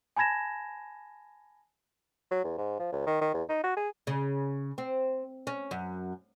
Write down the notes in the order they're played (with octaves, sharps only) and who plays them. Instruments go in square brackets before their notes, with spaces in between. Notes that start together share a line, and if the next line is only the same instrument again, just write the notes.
[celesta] G#5 A5 B5 G#6 A#6 E7
[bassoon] F#3
E2
G#2
F3
C#2
D#3
D#3
E2
D#4
F#4
G#4
[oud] C#3
C4
C#4
F#2